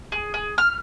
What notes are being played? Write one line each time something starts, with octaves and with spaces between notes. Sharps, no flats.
G#4
G#4
F6